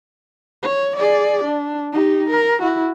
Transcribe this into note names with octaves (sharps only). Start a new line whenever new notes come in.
C#5
G#4 D5
D4
D#4 G4
A#4
E4 F#4